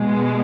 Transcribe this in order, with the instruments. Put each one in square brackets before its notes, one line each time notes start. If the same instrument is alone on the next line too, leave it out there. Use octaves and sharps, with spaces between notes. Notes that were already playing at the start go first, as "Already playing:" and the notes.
Already playing: [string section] B2 G#3